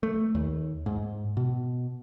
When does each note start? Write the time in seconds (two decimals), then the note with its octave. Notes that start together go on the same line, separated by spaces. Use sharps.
0.03 A3
0.35 D#2
0.86 G#2
1.37 B2